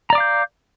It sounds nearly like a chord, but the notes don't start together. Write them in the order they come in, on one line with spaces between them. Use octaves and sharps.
A#5 D5 D6 F5 G6